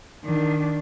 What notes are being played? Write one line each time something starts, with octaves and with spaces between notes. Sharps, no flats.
D#3 D4